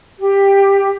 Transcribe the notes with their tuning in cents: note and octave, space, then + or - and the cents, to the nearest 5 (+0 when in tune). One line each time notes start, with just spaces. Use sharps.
G4 +10